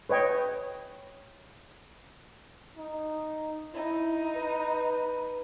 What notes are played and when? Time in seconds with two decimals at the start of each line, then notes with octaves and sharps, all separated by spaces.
0.09 B4 C#5 D#5 G5
2.77 D#4
3.74 D#4 E4
4.36 B4